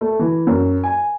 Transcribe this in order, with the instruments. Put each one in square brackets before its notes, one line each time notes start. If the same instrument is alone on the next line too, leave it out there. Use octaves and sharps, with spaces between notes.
[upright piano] A3
E3
F#2
G#5